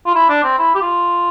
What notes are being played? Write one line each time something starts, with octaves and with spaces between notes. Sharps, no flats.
F4
E4
D4
C4
E4
G4
F4